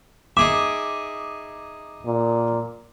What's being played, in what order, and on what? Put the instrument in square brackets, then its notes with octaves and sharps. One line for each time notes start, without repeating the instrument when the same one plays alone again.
[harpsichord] D#4 G#4 E5 [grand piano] D6
[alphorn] A#2